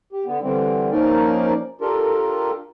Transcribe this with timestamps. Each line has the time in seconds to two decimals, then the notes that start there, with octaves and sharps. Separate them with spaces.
0.12 G4
0.26 D3 B3
0.42 D3 E3 G3 C4
0.91 F3 A#3 C#4 D#4 A#4 D5
1.81 D4 F4 G4 A4 A#4